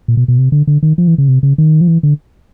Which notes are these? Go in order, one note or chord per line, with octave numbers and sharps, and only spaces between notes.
A#2
B2
B2
C3
D3
D3
D#3
F3
E3
C#3
C3
C#3
D#3
F3
E3
D3